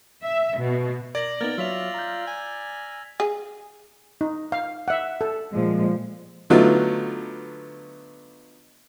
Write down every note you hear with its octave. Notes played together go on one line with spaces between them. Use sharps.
E5
B2
A#4 D5 G#6 A#6 F#7
A#3 B3 D#4 A#4 F6 G#6 A6
F#3 F4 C#5 E5 E6 B6 F7
A#5 G6
G#5
G#4
D#4
F5
E5 F#5
A4
A#2 F3 G#3
D3 F#3 A3 B3 D#4 F4